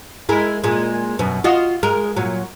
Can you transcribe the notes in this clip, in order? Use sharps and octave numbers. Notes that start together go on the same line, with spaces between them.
G#3 E4 A#4
A#2 G#3
F#2 B2
F4 F#4 D#5
G#3 A#4
A#2 F#3